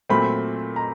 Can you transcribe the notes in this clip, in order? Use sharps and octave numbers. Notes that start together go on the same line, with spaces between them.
A#2 F#3 A3 C4 B5
A#5